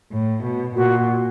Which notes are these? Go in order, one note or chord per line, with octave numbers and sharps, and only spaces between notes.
A2
B2
A#2 F#4